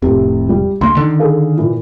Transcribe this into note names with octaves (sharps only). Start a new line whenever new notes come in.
F1 A2 C3
G3
D2 A#3 C6
D3 D#3
G#4 A4 F5
A#2 E3